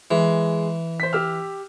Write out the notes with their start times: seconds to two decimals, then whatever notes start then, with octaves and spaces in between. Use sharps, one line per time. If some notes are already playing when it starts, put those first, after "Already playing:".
0.11 E3 G#3
1.00 C5 B6
1.13 G4 E6 F6